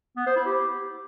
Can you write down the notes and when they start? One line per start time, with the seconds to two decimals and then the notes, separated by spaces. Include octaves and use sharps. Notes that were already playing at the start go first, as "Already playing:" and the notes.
0.17 B3
0.26 C5
0.36 E4
0.46 G4